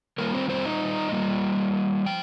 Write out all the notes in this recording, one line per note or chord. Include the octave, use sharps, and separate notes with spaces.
D#3 G3 A#3 F4 A#4
C4 C5
C4 C5
D#4 D#5
G3 A#3 F4
F3 G5